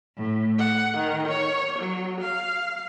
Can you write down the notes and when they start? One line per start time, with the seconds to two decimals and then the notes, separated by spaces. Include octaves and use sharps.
0.17 A2
0.57 F#5
0.97 D#3
1.28 C#5
1.78 F#3
2.20 F5